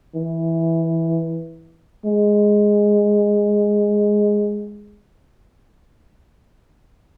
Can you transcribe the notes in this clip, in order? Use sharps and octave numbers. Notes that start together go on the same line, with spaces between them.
E3
G#3